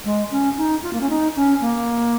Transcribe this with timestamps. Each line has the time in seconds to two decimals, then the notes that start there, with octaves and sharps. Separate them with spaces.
0.05 G#3
0.31 C#4
0.57 D#4
0.83 F4
0.93 A#3
1.01 C#4
1.09 D#4
1.36 C#4
1.61 A#3